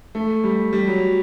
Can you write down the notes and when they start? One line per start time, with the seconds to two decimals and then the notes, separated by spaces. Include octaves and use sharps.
0.15 A3
0.44 G3
0.73 G3
0.87 F#3